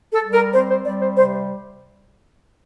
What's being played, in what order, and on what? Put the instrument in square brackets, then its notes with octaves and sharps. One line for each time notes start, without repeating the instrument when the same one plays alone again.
[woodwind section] A4
G3
A#4
C4 C5
C5
G3 D5
C5
C3 C5